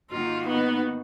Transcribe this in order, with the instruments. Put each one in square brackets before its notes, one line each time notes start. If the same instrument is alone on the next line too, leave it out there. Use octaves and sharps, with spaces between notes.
[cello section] G#2 D#3 A#3 D#4 F#4 [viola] F4
[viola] B3